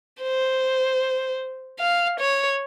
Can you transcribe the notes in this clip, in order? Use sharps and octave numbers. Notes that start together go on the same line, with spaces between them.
C5
F5
C#5